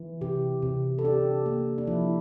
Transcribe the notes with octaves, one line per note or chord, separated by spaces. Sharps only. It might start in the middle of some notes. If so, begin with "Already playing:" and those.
Already playing: E3
C3 G4
C3
A4
D4 G4
A#3
D4
F3 E4